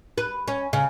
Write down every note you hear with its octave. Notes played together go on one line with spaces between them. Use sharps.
B4
C#4
C#3